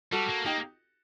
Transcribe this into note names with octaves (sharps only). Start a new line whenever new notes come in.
G3 F#4 A4
A#3
A#3 D#4 G4